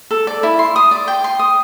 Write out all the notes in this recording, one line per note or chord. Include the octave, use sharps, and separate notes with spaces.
A4
D5
E4
C6
D#6
D5
G5
C6
D#6